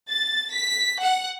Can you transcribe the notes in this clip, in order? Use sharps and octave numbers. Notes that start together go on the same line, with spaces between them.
A6
B6
F#5